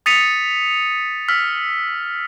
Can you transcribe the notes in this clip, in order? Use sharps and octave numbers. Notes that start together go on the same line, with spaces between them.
D#6 A6 B6 C#7 D#7 F7
E6 F6 B6